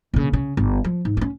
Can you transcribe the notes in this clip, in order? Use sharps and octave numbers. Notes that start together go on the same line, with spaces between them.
A#1 C#3
C#3
G1
F3
G#2
C#4 D4